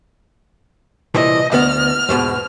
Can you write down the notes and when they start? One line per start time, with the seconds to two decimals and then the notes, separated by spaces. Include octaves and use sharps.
1.15 C2 A#2 E3 D#5
1.53 D2 B3 F6
2.09 E2 G#2 B2